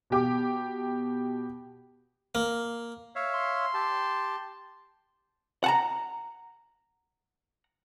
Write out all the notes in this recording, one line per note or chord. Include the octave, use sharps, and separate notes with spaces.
B2 G4 D6
A#3
C#5 E5 F5
C6
G4 A5
F#5 A5 A#5